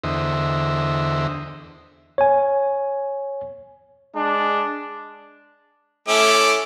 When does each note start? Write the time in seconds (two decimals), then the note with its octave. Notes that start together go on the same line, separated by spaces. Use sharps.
0.04 E2 D3 C5 D#5 E5
2.18 C#5 G#5
4.15 G#3 D4
6.08 A3 C#4 E4 D6